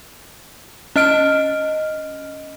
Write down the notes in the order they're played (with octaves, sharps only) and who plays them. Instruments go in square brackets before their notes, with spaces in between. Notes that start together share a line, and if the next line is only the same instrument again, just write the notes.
[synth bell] C#4 D#5 F6 D7